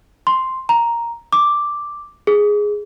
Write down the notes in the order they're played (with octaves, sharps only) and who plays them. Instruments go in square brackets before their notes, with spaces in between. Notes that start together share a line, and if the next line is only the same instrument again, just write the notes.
[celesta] C6
A#5
D6
G#4